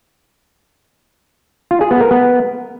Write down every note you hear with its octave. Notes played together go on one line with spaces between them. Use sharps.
F4
G#4
B3
A#4
B3